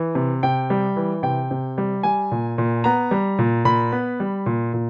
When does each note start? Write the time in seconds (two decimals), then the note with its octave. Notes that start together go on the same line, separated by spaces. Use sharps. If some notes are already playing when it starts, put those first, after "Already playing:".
Already playing: E3
0.15 C3
0.43 C3 G5
0.70 G3
0.96 E3
1.23 C3 G5
1.51 C3
1.78 G3
2.03 G3 G#5
2.31 A#2
2.58 A#2
2.84 B3 A#5
3.11 G3
3.39 A#2
3.65 A#2 B5
3.92 B3
4.20 G3
4.46 A#2
4.74 A#2